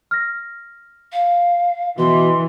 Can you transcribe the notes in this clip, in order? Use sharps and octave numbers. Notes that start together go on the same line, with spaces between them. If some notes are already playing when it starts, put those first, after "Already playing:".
F6 A#6
F5
B2 E3 C6